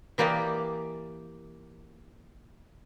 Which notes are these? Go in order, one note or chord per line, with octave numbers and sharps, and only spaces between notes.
E3 A#3 G4 D5 D#5